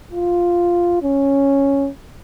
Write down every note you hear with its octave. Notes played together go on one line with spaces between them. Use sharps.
F4
C#4